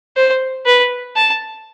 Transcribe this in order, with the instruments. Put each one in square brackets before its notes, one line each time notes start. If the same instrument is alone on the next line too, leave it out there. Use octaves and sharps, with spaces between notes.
[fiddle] C5
B4
A5